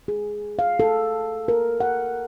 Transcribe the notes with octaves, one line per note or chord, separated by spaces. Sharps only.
G#4
F5
A4
A#4
F#5